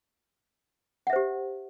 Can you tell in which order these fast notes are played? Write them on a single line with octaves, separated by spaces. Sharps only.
F#5 E5 C5 G4